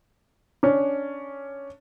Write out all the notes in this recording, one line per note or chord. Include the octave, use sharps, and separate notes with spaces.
C#4 D4